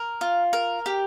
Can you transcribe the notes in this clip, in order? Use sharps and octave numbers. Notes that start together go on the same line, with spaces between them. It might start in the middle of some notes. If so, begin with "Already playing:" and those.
Already playing: A#4
F4
A#4
G4